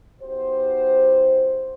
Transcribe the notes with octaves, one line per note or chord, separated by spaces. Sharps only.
B3 D#4 F#4 G4 C5